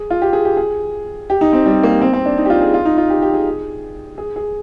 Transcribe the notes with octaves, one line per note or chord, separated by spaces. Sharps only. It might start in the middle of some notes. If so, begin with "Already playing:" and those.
Already playing: G#4
F4
G4
G#4
G4
G#4
G4
D#4
C4
G3
A#3
C4
C4
D4
D#4
G4
F4
G#4
F4
D#4
F4
G4
G4
G#4
G#4
G#4